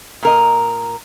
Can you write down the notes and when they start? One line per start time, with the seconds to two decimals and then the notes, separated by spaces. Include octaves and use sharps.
0.23 A#2 A#4 D#5